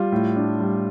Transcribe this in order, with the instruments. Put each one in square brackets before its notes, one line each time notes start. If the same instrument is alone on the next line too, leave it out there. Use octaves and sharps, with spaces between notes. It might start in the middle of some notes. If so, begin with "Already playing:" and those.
Already playing: [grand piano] G3 F4
A2
D4
G3